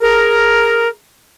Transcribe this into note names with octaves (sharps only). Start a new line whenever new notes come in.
G#4 A#4